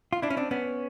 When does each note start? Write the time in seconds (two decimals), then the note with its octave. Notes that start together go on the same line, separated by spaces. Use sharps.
0.13 F4
0.22 D4 E4
0.30 C#4
0.37 C4 D4
0.51 B3 C#4